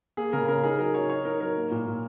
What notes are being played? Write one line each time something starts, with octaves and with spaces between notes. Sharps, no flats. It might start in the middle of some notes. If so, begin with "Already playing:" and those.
A#3 G#4
C#3 A#4
C#4 A#4
D#4 G#4
F#3 A#4
F#3 C#5
D#4 C#5
D#4 A#4
F#3 A#4
A#3
A#2
A#2